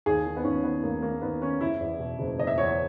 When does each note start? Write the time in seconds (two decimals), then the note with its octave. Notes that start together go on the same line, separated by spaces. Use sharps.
0.06 D#2 G#4
0.25 D#3
0.37 B3
0.44 D#2 C#4
0.64 D#3 B3
0.83 D#2 A#3
1.02 D#3 A#3
1.21 D#2 B3
1.41 D#3 C#4
1.60 F#1 E4
1.81 E2
2.00 B2
2.19 F#1
2.38 F#1 D#5
2.47 E5
2.57 E2 C#5